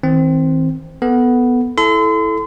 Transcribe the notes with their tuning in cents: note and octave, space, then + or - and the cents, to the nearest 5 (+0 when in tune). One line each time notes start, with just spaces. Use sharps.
D#3 +45 C4 +0
B3 +0 A4 +0
E4 +0 A4 -15 C6 -40